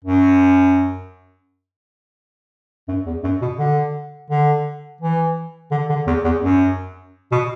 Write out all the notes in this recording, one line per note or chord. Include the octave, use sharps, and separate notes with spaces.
F#2
F#2
E2
F#2
B2
D3
D3
E3
D3
D3
E2
E2
F#2
B2